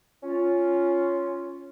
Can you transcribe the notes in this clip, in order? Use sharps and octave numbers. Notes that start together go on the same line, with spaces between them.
C#4 F4